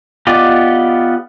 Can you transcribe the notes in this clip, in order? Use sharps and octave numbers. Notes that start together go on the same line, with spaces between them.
B3 F4 G4 D5 D#5